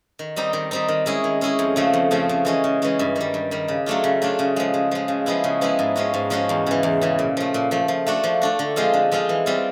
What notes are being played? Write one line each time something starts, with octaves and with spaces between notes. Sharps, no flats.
D#3
G3 C4 D#4
D#3
G3 C4 D#4
D#3
G#3 C#4 E4 G#4
D#3
G#3 C#4 E4 G#4
F2
C#3 F3 A3 C4
F2
C#3 F3 A3 C4
C#3
E3 G#3 C#4
C#3
E3 G#3 C#4
G2
D#3 G3
G2
D#3 G3
C#3
F#3 A3 D4 F4
C#3
F#3 A3 D4 F4
C#3
F3 G#3
C#3
F3 G#3
C#3
F3 G#3 B3 E4
C#3
F3 G#3 B3 E4
G#2
F3 G#3 C#4 F#4
G#2
F3 G#3 C#4 F#4
E2
C#3 E3
E2
C#3 E3
A#2
F3 A3
A#2
F3 A3
F3
A3 D4 F#4
F3
A3 D4 F#4
D3
F3 G#3 C4 F4
D3
F3 G#3 C4 F4
E3
G3 C4 F4